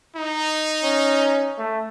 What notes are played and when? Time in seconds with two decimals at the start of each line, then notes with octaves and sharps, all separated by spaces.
0.16 D#4
0.83 C#4
1.58 A3